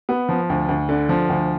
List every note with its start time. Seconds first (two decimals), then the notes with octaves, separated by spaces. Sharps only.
0.09 B3
0.29 F3
0.49 D2
0.68 D2
0.89 D3
1.09 F3
1.29 D2